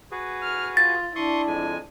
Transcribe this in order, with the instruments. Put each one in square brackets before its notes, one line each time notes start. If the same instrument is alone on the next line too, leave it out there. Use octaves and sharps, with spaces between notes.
[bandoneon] F#4 G#4 B4
[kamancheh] F6
[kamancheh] F4 [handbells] A6
[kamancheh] D4 E4 [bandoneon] C6 C#6 D#6
[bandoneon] F2 G#3 G#5